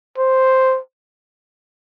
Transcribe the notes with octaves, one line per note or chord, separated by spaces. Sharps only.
C5